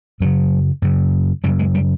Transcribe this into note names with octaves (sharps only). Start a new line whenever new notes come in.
F#2 C#3 F#3
F#2 C#3
F#2 C#3 G3
G#3
G3